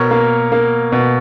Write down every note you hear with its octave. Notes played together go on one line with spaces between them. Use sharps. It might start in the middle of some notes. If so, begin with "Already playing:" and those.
Already playing: B2 A#4 C#5
A#3
A#3
B2